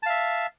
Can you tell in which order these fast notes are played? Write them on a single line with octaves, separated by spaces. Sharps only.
A5 F5 E5